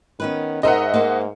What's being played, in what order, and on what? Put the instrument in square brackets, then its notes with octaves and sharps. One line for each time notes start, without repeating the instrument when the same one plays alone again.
[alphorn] D#3 [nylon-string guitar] B3 C#4 B4
[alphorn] G#2 [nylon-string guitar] D#4 A#4 C5 [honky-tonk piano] D#5 E5 F#5
[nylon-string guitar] A#3 C5